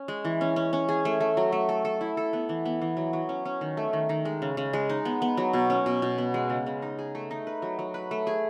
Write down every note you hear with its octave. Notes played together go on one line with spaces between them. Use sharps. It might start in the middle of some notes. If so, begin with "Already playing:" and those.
Already playing: C#4
G#3
E3
C#4
C#4
C#4
G#4
A3
A3
F#3
A3
A4
A4
E4
A4
B3
E3
B3
E3
F#3
F#3
C#4
C#4
D#3
A3
D#3
D#3
G#3
C#3
C#3
G#3
D#4
B3
B3
F#3
B2
C#4
B2
B2
B3
G#3
C#3
C#3
D#4
G#4
A3
D#4
B4
F#3
F#3
B4
A3
G#4